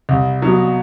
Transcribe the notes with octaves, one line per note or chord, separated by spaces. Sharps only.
C2
B2 F#3